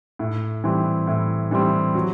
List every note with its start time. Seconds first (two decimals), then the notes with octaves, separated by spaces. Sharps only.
0.19 A2
0.64 E3 G3 C4
1.07 A2
1.51 E3 G3 C4
1.95 F#3